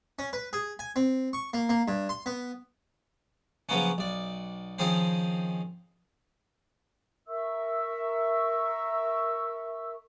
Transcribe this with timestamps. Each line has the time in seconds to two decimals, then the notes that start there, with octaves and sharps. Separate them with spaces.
0.19 C#4
0.33 B4
0.53 G#4
0.79 G#5
0.96 C4
1.33 C#6
1.54 A#3
1.69 A#3
1.88 G2
2.09 C6
2.26 B3
3.69 C#3 F3 F#3 A#3 B3 C#4
3.98 B1 D5
4.78 D#3 F3 C4 C#4 G#4 C5
7.27 A#4 E5 C#6 E6